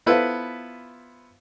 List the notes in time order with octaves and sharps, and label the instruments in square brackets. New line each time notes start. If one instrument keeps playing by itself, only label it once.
[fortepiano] B3 E4 F4 A4 B4 C5